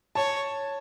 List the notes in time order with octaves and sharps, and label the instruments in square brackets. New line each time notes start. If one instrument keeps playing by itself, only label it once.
[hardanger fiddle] C#5 [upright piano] A5